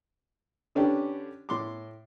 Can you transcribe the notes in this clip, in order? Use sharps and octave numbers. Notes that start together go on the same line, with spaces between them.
D3 C#4 D4 G4 B4
A2 C6 D6